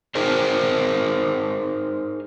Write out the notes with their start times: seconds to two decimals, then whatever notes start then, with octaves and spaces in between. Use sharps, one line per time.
0.15 D#4 G#4 A#4 C5